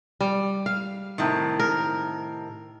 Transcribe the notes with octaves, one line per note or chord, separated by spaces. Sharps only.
G3
F5
A2 C3 D#3
A#4